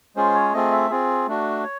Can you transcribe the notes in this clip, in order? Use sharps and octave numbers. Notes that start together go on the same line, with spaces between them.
G#3 C#4 F4 G#4 C5
C#5
A3 C4 F4 G#4 D#5
E5
C4 F4 G#4
A3 D4 F#4
C#5